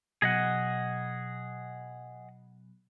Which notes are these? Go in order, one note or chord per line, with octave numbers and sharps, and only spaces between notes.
B2 F#3 G#4 D#5 F#5